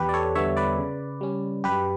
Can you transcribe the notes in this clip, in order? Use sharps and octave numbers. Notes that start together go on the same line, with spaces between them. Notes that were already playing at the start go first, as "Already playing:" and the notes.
Already playing: E2 G4 B4
D5
A4 C#5
D3 G3 B3 C#5 E5
B4 D5
C#3
G3 C#4
F#2 G4 B4